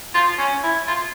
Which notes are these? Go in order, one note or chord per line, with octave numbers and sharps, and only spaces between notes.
F4
C#4
E4
F4